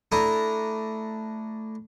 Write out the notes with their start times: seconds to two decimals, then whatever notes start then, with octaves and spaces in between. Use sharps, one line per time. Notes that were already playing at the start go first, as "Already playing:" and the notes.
0.12 A3 D4 E4 A#5 D#6